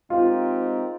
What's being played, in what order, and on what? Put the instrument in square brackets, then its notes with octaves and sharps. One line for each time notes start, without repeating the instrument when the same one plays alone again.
[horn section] G#3 C4 D#4 G4 A#4 [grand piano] F4